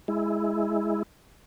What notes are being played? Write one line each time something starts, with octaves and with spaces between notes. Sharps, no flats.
G#3 E4